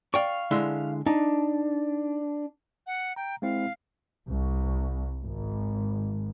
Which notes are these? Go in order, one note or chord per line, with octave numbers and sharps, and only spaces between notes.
D5 F5 G5 C#6
D3 G#3 E4
D4 D#4
F#5
G5 A#5
G#3 C4 E4 F5
C2
G#1